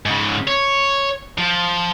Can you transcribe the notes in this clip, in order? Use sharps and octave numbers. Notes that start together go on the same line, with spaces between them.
G#2 C#3
C#5
F3